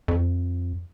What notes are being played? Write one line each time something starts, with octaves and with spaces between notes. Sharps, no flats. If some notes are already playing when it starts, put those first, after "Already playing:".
F2